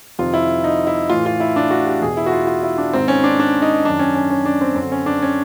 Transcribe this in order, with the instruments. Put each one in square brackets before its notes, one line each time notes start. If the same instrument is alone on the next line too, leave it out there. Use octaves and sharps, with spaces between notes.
[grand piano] F2 C3 D#3 F4
E4
D#4
E4
A2 E3 F4
F4
E4
D4
F#4
G4
E2 B2 G#4
E4
F#4
F4
F4
E4
D4
G#2 D#3 C4
C#4
D4
D4
D#4
F#2 D#3 D4
C#4
C#4
C#4
D4
C4
F#2 D3 C4
C#4
D4
C#4